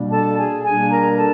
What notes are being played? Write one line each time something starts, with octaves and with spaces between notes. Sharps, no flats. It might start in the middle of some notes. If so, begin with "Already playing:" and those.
Already playing: B2 G3 A#3 D4
A4 A5
G#4 G#5
B2 G3 A#3 D4 G#4 G#5
A#4 A#5
A4 A5